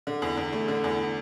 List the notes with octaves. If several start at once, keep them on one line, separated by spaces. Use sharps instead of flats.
D3
E2
E2
A3
D3
E2